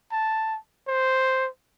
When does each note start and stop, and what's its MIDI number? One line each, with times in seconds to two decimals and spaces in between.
0.12 0.58 81
0.87 1.48 72